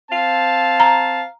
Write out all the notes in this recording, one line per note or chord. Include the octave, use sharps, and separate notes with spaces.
C4 F5 A5
A#5